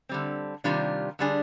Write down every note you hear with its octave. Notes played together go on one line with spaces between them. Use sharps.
D3 G3 C4
C3 D#3 G3 D4 F4
D3 G3 D4 G#4